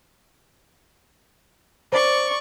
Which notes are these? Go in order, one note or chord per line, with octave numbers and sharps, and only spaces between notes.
C5 D5 C#6